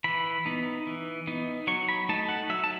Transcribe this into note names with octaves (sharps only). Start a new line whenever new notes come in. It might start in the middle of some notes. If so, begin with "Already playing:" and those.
E3 B5
B3 D#4
E3
B3 D#4
F#3 C#6
B5
A3 D#4 A5
F#5
F#3 E5
A5